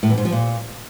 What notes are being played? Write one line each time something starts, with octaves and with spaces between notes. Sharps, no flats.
A2
E2
G#2
F3
A#2